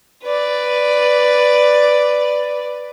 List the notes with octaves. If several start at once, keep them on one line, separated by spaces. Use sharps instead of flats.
B4 D5